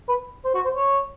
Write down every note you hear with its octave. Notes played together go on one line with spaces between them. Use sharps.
B4
C5
F#4
C5
C#5